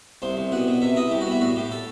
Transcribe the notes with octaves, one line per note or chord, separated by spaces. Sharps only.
C2 C5
C2
B2 F#5
B2
C3 E5
E4 D#5
C2 G4
F#4
B3
E4
A2 F#4
A2 G4
A4